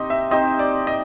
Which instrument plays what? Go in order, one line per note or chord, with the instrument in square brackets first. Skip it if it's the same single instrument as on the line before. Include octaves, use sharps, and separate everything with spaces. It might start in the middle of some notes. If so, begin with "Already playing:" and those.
Already playing: [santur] C4 D#4 G4 C5 [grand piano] D#5
[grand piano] E5
[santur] C4 D#4 G4 C5 [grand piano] D#5
[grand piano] D5
D#5